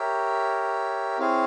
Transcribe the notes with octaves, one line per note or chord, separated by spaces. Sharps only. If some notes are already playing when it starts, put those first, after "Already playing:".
Already playing: G4 A#4 C#5 E5
C4 E4 G#4 C#5 F5